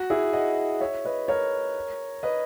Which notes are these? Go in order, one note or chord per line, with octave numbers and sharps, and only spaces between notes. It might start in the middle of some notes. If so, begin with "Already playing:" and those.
Already playing: F#4
E4 G#4
D#5 F#5
C#5 E5
B4 D#5
A#4 C#5
B4 D#5